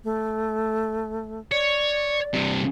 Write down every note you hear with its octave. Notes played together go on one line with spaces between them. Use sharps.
A3
C#5 D5
G2 C3